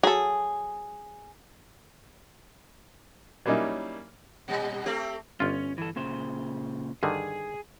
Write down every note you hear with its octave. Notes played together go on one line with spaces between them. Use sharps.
F#3 G#4 A4
F#3 G3 A#3 C#4 D#4 E4
A#2 G3
A3 C4 G4
G1 C#4 F4
E3 A4
A#2 C#3 C5
G2 D3 D#3 G#4